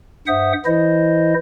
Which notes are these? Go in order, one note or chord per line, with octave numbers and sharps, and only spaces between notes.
G2 C5 E5 F#5 D#6
E3 E4 C5 D#5